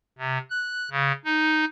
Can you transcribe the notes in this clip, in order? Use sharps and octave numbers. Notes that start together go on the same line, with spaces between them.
C3
F#6
C#3
D#4